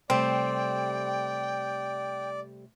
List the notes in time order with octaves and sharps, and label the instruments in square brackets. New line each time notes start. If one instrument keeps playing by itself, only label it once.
[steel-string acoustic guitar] C3 G3 A3 [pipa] C4 [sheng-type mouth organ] D5 [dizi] G5